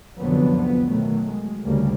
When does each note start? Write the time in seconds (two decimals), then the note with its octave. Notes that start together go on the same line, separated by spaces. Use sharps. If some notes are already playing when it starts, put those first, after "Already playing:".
0.18 C2 F2 D3 F3 F#3 B3
0.58 B3
0.91 B2 D#3 F#3 A3
1.27 G#3
1.64 D2 C#3 G3 A#3